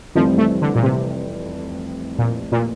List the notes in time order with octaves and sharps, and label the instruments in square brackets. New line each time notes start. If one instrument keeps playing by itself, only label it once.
[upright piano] F1 F2 E3 G3 C4 [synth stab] F3
[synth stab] A3
D3
A#2
C3
A#2
A#2